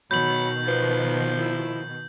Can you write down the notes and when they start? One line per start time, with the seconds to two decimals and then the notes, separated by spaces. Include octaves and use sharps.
0.11 B2 D#3 F#3 B5 G6 F#7
0.67 F3 B4
1.39 E4